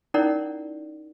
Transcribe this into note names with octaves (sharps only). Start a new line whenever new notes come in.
C#4 D#4 E4 A#4 D5 F#5